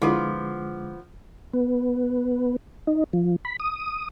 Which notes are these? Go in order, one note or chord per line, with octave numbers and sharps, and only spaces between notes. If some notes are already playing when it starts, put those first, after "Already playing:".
D3 F3 G#3 B3 E4 F4 D6
B3
D#4
F3
B5
D#6